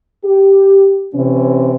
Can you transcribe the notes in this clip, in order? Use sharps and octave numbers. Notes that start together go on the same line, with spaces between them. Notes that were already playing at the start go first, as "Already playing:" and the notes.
G4
C3 E3 C#4